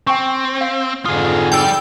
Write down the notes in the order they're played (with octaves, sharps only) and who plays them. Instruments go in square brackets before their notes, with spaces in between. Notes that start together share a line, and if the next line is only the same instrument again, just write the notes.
[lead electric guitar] C4 [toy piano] G5 G#5 C#6
[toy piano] F5
[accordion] F2 G#2 D3 [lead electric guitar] F4 G#4 [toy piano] D#6
[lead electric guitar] G3 D5 [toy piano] D#4 F4 [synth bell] G5 E6